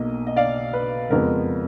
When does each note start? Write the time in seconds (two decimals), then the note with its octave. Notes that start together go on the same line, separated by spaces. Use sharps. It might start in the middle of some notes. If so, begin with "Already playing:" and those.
Already playing: B1 B2 A#3 D#5
0.27 D#5
0.36 D5 F5
0.73 B4
1.10 F#1 F2 F3 G#3 B3 A#4